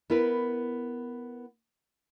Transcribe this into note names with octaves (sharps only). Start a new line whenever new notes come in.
B3 E4 A#4 B4